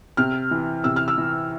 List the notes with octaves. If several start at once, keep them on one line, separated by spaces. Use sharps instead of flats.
C3 F6
E3
C3 E6
F6
E6
E3